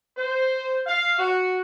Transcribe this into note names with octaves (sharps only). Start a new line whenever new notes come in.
C5
F5
F#4